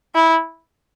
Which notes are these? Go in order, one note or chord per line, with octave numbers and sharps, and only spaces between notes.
E4